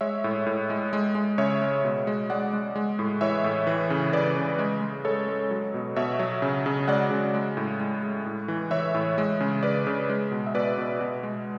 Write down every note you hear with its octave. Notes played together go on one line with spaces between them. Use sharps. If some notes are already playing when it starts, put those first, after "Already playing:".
G#3 C#5 E5
A2
A2
G#3
G#3
G#3
C#3 C#5 E5
G#3
B2
G#3
G#3 D5 F#5
G#3
G#3
A2
E3 C#5 E5
A2
E3
C#3
C#3 B4 D5
C#3
G#3
G#3
G#3 A4 C#5
G#3
F#3
B2
B2 C#5 E5
F#3
C#3
C#3
G#3 D5 F#5
C#3
G#3
A2
G#3
G#3
A2
E3
E3 C#5 E5
A2
G#3
C#3
C#3 B4 D5
C#3
G#3
B2
E5
B2 B4 D5
B2
B2
G#3